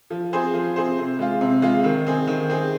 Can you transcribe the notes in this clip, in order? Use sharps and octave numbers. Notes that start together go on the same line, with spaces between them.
F3
C4 G#4 C5
F3
C4 G#4 C5
C3
G#3 F4
C3
G#3 F4
D#3
C4 G#4
D#3
C4 G#4